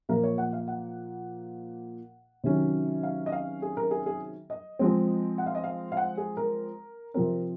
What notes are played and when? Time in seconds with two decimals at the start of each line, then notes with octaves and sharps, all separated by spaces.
0.09 A#2 F3 A#3 A#4
0.23 C#5
0.38 F#5
0.53 F5
0.68 F#5
2.44 C3 D#3 F#3 C#4
3.03 F5
3.26 D#5
3.32 F5
3.62 G#4
3.77 A#4
3.91 G#4
4.06 G#4
4.50 D#5
4.79 F3 G#3 C4
5.38 F#5
5.46 F5
5.55 D#5
5.64 F5
5.92 F5
5.97 F#5
6.17 G#4
6.37 A#4
7.14 C3 F3 C4 A#4